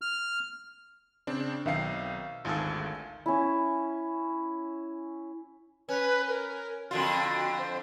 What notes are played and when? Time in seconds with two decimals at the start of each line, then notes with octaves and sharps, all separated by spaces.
0.02 F6
1.27 C#3 C4 D4
1.66 B1 D#3 C4 D#4 E5 F5 C7
2.45 G#1 D2 D#3 F4 G#4 A4
3.26 C#4 E4
5.89 C#4 B4
6.28 A#4
6.91 F2 D3 F4 F#4
7.58 C5